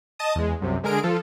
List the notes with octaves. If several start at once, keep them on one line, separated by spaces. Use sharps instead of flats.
D#5 A5 D#6
E2 G#3
C2 F#2 C3
D3 G#3 G#4 A#4 D7
F3 F4 A4